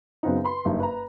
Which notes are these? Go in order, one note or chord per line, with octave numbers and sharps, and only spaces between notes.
F#2 C#3 B3 C4 D#4
B4 B5 C6
F#1 G2 D#4
B4 A#5